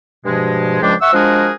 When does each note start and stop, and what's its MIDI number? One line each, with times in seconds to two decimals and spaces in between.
0.25 0.78 43
0.25 0.78 47
0.25 0.78 53
0.25 0.78 56
0.81 0.94 37
0.81 0.94 53
0.81 0.94 56
0.81 0.94 62
0.81 0.94 74
0.81 0.94 79
1.01 1.09 76
1.01 1.09 78
1.01 1.09 85
1.01 1.09 88
1.13 1.50 53
1.13 1.50 56
1.13 1.50 62
1.13 1.50 66
1.13 1.50 68
1.13 1.50 70